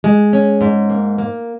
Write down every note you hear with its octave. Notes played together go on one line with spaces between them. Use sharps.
G#3
C#4
G#2
A#3
A#3